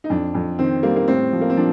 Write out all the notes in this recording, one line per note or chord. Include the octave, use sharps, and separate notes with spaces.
D#4
F2 D4
F2
D#3 C4
G3 A#3
A#3
A2 C4
F3
A#3
C4
F3 D4